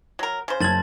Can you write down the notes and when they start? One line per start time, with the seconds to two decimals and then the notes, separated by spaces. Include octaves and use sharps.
0.19 F#3 A#4
0.48 C#3 C5
0.61 F#1 A5 G#6 A6 F#7